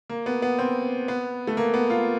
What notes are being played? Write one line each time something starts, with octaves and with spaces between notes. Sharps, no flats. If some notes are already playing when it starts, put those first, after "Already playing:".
A#3
B3
B3
C4
B3
A3
A#3
B3
F4